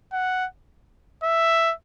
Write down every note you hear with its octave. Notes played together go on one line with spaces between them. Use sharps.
F#5
E5